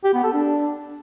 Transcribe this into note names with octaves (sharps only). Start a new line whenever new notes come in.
G4
B3
A4
D4